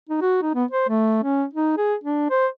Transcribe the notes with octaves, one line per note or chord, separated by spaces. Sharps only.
D#4
F#4
D#4
B3
C5
A3
C#4
D#4
G#4
D4
C5